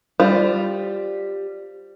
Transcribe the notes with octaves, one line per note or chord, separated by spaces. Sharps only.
G3 F4 C5